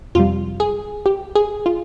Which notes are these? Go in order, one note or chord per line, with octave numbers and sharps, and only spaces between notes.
F2 C3 G3 F4
G#4
G4
G#4
F4